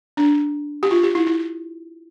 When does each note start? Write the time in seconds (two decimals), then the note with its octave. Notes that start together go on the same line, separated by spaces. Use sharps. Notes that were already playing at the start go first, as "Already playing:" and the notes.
0.17 D4
0.83 G4
0.91 F4
1.03 G4
1.15 E4
1.27 E4